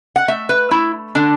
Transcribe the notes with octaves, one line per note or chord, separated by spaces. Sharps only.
F#5
A3 E5
B4
A3 E4
D3 D4